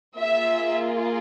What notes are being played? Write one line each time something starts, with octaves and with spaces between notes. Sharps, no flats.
A#3 F4 G#4 E5